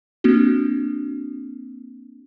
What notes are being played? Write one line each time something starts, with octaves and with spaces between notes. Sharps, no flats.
A#3 C4 D4 F#4